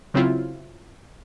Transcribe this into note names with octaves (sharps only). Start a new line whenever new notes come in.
C#3 F#3 C4 E4 F4